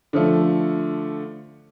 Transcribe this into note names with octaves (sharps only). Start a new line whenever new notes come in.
D3 F3 A3